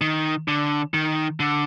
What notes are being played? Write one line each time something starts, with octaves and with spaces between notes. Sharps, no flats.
D#3
D3
D#3
D3